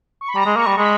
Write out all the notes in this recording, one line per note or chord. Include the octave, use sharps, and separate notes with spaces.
C#6
B5
G3 A#5
G#3
A#3 C#6
G3
G#3 B5